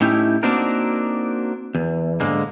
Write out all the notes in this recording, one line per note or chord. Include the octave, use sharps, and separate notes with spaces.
A2 C#4 D#4 E4 G4
A#3 C4 D4 D#4 F#4 A#4
E2
G#2 D3 G#3 A#3